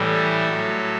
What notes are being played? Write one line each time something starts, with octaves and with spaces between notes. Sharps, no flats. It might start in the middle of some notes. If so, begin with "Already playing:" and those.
Already playing: A2 E3 G3
A4
A2 F#3